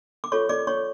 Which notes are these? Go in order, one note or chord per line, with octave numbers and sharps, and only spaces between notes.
D6
F4 A4 C#5 C#6
D5 D6
C#5 C#6